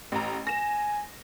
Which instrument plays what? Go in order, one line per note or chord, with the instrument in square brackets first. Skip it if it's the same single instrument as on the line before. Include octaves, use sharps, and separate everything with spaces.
[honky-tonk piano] A1 A#5
[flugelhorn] G#5 [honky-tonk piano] A#6 E7